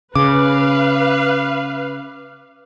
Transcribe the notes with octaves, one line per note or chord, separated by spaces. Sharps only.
C#3 B4 F5 D6